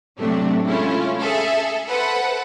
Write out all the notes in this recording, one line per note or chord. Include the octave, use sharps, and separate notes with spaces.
A2 C3 F#3 A3 D4
G#3 A3 C#4 E4 F4
G#4 A4 E5
A4 B4 C5 F#5 B5